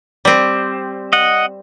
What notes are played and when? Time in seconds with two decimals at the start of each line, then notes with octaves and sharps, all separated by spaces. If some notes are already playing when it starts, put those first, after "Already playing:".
0.25 G3 C4
1.13 D#5 F#5